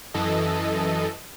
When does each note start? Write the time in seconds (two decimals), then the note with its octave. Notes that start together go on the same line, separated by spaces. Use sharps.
0.14 F#2 E3 A4 D#5